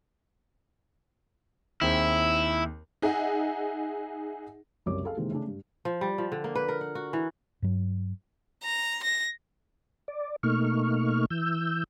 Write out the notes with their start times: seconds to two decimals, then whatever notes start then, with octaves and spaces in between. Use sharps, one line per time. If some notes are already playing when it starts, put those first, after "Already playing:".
1.81 D#2 C4 E4 G#4
3.02 D#4 G#4 D#5 E5 F#5
4.86 F#1 C2 C#5 D6
5.04 G#4 A4 F5
5.16 C3 D#3 E3 G#3 A#3
5.30 C#3 A3 D4
5.47 G2
5.85 F3
6.01 G3
6.18 F3
6.32 D3
6.44 A#3
6.55 B4
6.68 A#4
6.81 F#5
6.95 F#4
7.13 E3
7.62 G2 F#3
8.64 A#5
9.04 A#6
10.08 D5
10.43 B2 A3 A#3 D#4 C#6 F6
11.30 E3 E6 G6